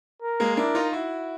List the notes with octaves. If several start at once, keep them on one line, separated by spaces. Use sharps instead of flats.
A#4
G#3 A#3
D4 E4 A#4
D#4 F4
E4 F#4